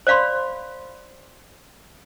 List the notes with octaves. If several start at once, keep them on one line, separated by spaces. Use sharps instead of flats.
C5 D5 F5 B5 C6